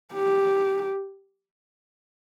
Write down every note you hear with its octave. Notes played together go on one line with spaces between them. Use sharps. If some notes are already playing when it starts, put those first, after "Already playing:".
G4